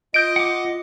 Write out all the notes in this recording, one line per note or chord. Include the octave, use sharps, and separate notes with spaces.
F4 D#5 G6 D7
F#5 D6